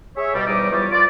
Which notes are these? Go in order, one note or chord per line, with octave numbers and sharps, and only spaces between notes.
G#4 C#5 E5
B2 G3
E2 G#2 G3 D#4 D6
E2 F3 G3 G4 C#5 D5
F4 D5